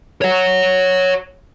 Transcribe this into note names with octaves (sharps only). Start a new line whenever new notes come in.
C#5 F#5